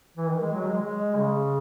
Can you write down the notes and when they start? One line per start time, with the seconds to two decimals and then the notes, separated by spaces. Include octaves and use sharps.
0.17 E3
0.29 D#3
0.41 G#3
0.53 F#3
0.66 G#3
0.78 G#3
1.17 C#3